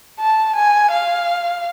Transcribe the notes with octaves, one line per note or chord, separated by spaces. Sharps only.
A5
G#5
F5